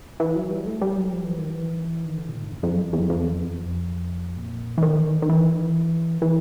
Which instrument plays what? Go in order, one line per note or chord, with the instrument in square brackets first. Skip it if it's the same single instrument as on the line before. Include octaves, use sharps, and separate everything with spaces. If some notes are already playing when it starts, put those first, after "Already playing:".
[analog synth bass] E3
F#3
G3
A3
G3
F#3
F3
E3
D#3
E3
D#3
D3
A#2
G#2
F2
F2
F#2
F2
E2
F2
F2
E2
F2
A#2
E3
D#3
D#3
E3
E3